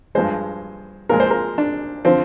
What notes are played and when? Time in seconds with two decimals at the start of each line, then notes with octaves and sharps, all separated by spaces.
0.15 G2 F3 G#3 C5
1.09 A#2 F3 G#3 A#4
1.20 C5
1.31 A#4
1.58 D4
2.05 D3 F3 C4